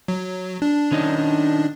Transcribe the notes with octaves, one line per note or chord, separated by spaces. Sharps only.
F#3
D4
D#3 C#4 D#4